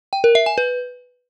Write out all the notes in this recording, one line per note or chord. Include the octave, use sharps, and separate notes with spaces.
G5
A#4
E5
G#5
B4